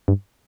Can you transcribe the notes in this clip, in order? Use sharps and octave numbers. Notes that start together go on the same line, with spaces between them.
G2